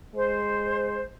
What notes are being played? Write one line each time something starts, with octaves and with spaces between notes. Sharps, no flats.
G#3 C5